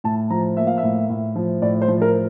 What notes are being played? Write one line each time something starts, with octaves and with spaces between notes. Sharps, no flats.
A2 A5
F3 A#5
A#3 E5
F5
E5
A2
A2
F3
A2 D5
C5
F3
A#4